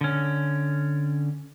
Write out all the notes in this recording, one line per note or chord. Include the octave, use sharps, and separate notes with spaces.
D3 C#4